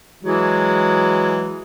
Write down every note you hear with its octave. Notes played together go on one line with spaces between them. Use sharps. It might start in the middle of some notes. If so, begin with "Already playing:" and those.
E3 F#3 G#3